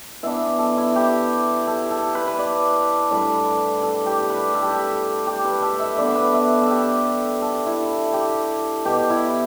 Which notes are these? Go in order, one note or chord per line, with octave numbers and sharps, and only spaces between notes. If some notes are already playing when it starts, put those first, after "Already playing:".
E3 B3 D4 E5
A4
E4
G4
A4
A4
B4
B4
D5
A2 G3 D4 D5
A4
G4
B4
A4
G4
A4
G4
B4
A4
E5
D3 B3 D4 D5
B4
E5
A4
G4
A4
E4
G4
B2 B3 D4 G4
E4